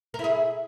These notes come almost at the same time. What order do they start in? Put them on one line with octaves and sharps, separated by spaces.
A#4 E4 G#4